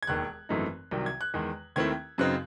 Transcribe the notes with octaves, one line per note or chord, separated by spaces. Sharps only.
G#6
E1 D#2 D#3 F#6
G#1 F#2 E3 A3 D#4
C2 C3 D#3 F#3
G#6
F#6
E2 D#3 G#3
D#2 D#3 A3 C4 E4 G#6
F#2 C#3 F#3 C4 D#4 F#6